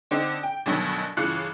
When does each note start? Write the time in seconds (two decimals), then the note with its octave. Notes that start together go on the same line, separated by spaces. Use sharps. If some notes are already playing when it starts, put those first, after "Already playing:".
0.11 D3 C4 D#4
0.43 G5
0.66 D2 G2 B2 D#3 F#3
1.17 G1 C#3 E3 F4 F#6 C#7